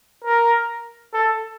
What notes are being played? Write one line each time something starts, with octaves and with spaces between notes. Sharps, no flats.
A#4
A4